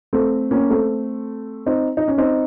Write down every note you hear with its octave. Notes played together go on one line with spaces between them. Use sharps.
A3 C4
A#3 C#4
A3 C4
C4 D#4
D#4
C#4
C4 D#4